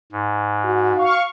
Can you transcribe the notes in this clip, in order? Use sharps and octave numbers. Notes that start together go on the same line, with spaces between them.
G#2
F#4
F5 C#6